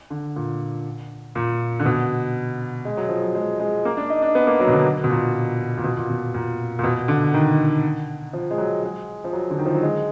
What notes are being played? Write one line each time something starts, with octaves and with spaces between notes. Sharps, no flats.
D3
A#2
A#2
D3
B2
G#3
F#3
F3
F#3
G#3
G#3
A#3
D4
D#4
D4
B3
A#3
F#3
B2
D3
B2
A#2
A#2
B2
A#2
B2
A#2
A#2
B2
D3
D#3
F3
G#3
F#3
G#3
F3
F#3
D3
D#3
F3
F#3
G#3